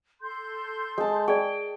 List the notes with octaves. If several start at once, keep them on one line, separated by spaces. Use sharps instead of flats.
A4 C6 G6
G#3 A5
G#4 D5 G5